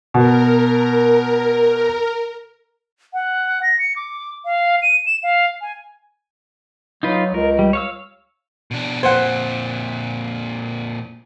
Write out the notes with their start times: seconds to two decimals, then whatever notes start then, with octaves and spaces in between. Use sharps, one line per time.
0.14 B2 A#4
3.13 F#5
3.63 A#6
3.79 C#7
3.96 D6
4.45 F5
4.82 D#7
5.06 E7
5.23 F5
5.61 G#5
7.03 F#3 D#4 F4 B4
7.34 C#2 A#4
7.59 G3
7.73 C#5 F5 E6
8.71 B2 D4
9.03 F2 A#2 C5 F#5